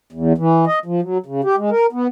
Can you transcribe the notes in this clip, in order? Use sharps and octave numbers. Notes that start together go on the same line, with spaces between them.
E2
E3
D#5
F3
F#3
C#3
G4
G#3
A#4
B3